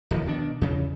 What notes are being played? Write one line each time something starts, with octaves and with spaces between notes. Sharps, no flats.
D1 D#3 F3
B2 D#3 D4
E2 C#3